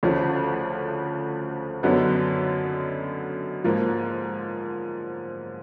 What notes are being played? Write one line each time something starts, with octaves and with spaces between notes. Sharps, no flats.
D2 C#3 F3
F#2 D3 F#3 B3 D#4
G#2 F3 A#3